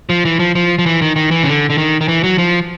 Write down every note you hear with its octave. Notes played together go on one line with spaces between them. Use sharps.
F3
E3
F3
F3
F3
E3
D#3
D#3
E3
C#3
D3
D3
D#3
D#3
E3
F#3
F3